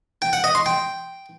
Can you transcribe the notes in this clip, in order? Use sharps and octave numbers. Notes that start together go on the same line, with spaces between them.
G5
F#5
D#5
C6
G5